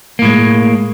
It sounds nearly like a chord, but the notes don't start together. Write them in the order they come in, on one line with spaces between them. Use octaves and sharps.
A#3 A2 G#3